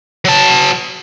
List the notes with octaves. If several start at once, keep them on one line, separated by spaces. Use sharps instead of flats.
F#3 A5